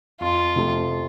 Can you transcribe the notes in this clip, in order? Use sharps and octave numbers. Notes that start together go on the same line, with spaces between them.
F2 F4
C3 F3 A3